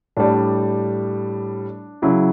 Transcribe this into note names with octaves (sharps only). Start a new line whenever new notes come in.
A2 G3 D4
C#3 F#3 E4